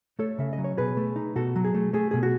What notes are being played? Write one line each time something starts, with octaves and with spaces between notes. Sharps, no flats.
A3 A4 C#5
C#3 E5
D#5
F#3
C#5
B2 G#4 B4
A3
D#4
B2 F#4 A4
F#3
G#4
A3
A3 G#4
B2 G#4
F#4